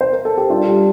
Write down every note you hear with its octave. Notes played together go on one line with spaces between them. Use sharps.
C5
A#4
A4
G4
G3 D4 F4
G3